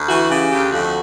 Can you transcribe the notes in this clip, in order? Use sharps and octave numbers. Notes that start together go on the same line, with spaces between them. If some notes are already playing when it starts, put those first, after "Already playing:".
Already playing: D2
E3 F#4
C#3 G4
D2 G4
F2 F#4